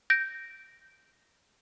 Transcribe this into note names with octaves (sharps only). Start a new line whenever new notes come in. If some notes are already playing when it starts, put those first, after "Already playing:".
G6 A#6 D7